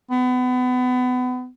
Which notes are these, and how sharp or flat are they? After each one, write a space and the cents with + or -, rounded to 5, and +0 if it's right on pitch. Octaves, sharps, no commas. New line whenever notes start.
B3 +30